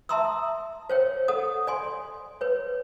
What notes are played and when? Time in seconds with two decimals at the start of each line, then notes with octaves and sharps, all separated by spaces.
0.09 E5 A5 A#5 C6 D#6 E6
0.90 C5 C#5 G5
1.28 A4 F#5 D#6
1.67 D5 G#5 C6
2.41 B4 C#5